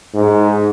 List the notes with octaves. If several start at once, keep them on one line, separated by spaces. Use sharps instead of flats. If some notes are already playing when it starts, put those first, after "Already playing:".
G#2